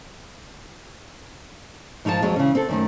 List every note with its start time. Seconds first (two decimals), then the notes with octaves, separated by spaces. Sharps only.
2.05 G#2 F3 F4 F#4 A5
2.22 F2 F#3 G#3
2.36 C#3 E3 C#4
2.55 C4 A4
2.69 F#2 D#3 A3